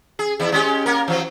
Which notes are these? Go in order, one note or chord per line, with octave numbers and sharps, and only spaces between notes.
G#4
E2 E4
G#3 C#4 G4
A#3 A#4
E3 F#3